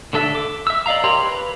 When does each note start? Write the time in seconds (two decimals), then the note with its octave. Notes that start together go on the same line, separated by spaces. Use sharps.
0.13 D3 D4 A4 E5
0.35 D6
0.67 E5 E6
0.86 D5 D#5 F5 A#5
1.04 G4 A#4 C#5 A#5 C6
1.24 B4